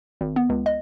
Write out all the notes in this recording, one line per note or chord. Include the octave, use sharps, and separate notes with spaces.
G#1
B3
C#2
D#5